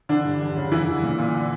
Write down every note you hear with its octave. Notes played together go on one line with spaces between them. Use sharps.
D3 E3 D4
G2
E2
C#3
F#2 E3 E4
D3
A#2
A#2
D3